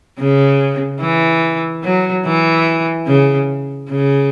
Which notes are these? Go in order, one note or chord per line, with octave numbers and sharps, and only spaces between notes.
C#3
E3
F#3
E3
C#3
C#3